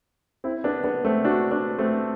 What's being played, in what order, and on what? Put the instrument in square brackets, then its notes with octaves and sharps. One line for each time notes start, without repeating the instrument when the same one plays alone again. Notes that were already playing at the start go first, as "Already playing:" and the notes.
[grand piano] C4 E4
B3 D4
B3 D4
A3 C4
D4 F#4
B3 D4
A3 C4